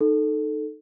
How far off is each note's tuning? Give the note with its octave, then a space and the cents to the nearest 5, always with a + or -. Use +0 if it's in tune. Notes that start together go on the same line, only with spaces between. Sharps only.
D#4 -15 A4 +0